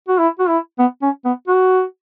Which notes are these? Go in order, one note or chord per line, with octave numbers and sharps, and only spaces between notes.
F#4
E4
F#4
E4
B3
C#4
B3
F#4